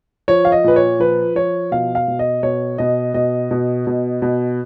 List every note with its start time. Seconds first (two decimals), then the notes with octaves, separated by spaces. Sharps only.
0.28 F3 C#5
0.45 F5
0.52 D#5
0.64 A#2 B4
0.76 C#5
1.00 F3 B4
1.35 F3 C#5
1.71 B2 F5
1.95 F5
2.08 B2
2.19 D#5
2.43 B2 C#5
2.78 B2 D#5
3.14 B2 D#5
3.51 B2
3.87 B2
4.22 B2